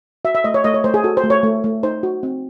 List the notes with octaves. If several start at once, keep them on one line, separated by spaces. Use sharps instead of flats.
F#4 E5
E5
A3 D#5
C#5
A3 D#5
C#5
A3 C5
G#4
F#4 A4
C5
A3
C#5
A3
A3
D#4 C5
F#4
C4